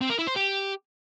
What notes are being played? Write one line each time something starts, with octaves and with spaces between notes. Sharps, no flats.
C4
A#4
E4
C5
G4